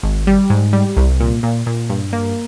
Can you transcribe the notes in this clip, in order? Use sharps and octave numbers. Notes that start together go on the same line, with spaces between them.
G#1
G3
G#2
G3
C2
A#2
A#2
A#2
G2
A#3